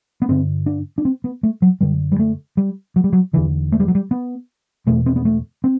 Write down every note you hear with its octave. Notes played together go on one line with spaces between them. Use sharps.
B3
G2 D3 C4
D4
D4
C4
B3
A3
F#3
F#2 D3 G3
G3
A3
G3
F#3
G3
F#3
E2 D3 E3
A3
G3
F#3
G3
B3
E2 B2 A3
C4
B3
A3
C4